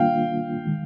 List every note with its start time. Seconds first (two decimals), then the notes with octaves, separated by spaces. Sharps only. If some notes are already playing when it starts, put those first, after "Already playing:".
Already playing: D#3 G3 A#3 D4 F4 F5 G5
0.65 D#3 G#3